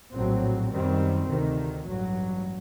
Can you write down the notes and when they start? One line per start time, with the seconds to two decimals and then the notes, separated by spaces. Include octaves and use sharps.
0.13 A#1 A2 F#3 C4
0.71 F#2 D#3 G3 C4
1.28 D2 C3 D#3
1.86 A1 G2 F#3